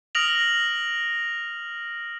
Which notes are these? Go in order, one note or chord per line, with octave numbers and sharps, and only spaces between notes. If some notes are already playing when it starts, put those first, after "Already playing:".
D#6 F6 A#6 D7 F7 F#7